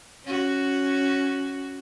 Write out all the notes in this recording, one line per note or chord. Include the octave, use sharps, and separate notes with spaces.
C#4 F#4